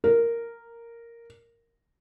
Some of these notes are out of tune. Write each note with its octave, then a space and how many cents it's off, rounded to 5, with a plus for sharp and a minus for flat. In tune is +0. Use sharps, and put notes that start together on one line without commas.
A#4 -5